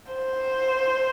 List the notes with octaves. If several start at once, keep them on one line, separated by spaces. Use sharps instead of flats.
C5